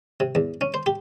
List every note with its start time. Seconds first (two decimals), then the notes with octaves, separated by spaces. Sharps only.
0.20 C3
0.35 E2
0.61 C#4
0.74 C5
0.86 G4